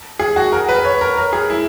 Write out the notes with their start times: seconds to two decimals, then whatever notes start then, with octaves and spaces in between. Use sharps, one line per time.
0.19 G#4
0.36 F#4
0.52 A#4
0.69 B4
0.85 C#5
1.01 A#4
1.17 A#4
1.33 G#4
1.50 E4